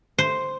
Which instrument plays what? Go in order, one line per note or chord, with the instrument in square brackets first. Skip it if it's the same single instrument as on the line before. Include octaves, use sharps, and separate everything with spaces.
[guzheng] C5